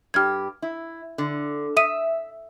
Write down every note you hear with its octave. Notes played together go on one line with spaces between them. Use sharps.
G2 G4 F6 G#6
E4
D3
E5 D#6 D#7